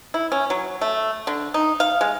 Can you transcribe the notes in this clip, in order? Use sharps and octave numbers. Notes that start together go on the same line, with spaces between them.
E4
C#4
F#3
A3
D3
D#4
F5
G#3